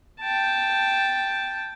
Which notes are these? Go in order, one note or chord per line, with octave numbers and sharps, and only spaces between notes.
G5 A5